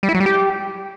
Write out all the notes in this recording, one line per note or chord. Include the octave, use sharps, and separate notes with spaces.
G3
E4
F#3
G3
G4